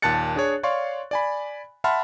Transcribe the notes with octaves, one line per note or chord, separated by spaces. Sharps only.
D#2 A#2 A5 F#6 A6 C#7
D4 G#4 C#5
C#5 D5 F5 C6 C#6
D5 G#5 B5
E5 F#5 A5 B5 C6 F6